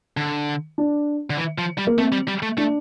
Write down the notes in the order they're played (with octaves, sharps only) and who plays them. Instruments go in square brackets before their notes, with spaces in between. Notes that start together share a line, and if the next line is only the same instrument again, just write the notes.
[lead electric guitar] D3
[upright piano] D4
[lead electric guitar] D3
E3
F3
G3
[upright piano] A#3
[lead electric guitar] A3 [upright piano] C4
[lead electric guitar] G3
G3
A3
[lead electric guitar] A3 [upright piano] D4